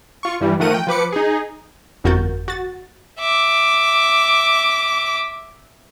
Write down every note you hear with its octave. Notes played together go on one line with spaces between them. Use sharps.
F4 C#6
G2 E3 G3
D#3 F3 A3 A#4 F#5 D#7
G5
F3 B4 D6 C#7
D#4 G#4
G1 F2 F#4 A#4 G6 A6
F#4 A6
E5 D6